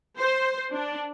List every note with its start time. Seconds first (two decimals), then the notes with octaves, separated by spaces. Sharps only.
0.17 C5
0.72 D4